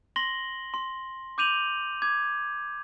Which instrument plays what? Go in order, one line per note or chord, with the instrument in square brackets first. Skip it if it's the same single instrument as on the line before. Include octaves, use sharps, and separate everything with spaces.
[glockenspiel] C6 A#6 F#7 G7
C6
D6 G6 D#7 F7 F#7
D6 G#6